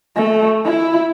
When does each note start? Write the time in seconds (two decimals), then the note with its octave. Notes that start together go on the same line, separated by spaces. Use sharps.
0.16 A3
0.64 E4